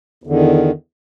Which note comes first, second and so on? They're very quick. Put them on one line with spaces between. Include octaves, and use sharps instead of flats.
E2 D3 D#3